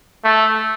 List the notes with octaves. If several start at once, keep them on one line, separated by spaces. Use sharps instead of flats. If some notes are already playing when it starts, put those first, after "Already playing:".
A3